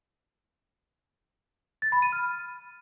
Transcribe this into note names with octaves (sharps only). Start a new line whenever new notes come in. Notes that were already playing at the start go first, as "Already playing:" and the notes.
A6
B5
D#7
F6